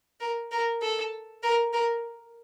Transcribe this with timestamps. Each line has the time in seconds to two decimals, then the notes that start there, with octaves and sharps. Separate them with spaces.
0.20 A#4
0.52 A#4
0.82 A4
1.43 A#4
1.73 A#4